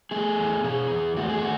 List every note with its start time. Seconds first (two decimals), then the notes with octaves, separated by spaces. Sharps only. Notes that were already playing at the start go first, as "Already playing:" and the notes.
0.11 A3 G#4
0.38 E2
0.64 B2 G#4
0.90 E2
1.17 A3 F#4
1.29 G#4
1.40 F#4